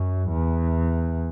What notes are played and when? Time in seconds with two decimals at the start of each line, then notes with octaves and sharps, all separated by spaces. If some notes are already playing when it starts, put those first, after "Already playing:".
Already playing: F#2
0.30 E2